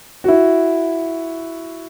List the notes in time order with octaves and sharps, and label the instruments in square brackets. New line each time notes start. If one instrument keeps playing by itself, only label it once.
[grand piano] E4 F#4